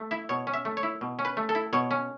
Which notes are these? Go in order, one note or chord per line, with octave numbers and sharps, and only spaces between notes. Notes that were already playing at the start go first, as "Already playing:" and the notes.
Already playing: A3
E4 E5
B2 C#5
C#4
E5
A3
C#5
E4
B2
C#4
B4
A3
A4
E4
B2 C#5
C#4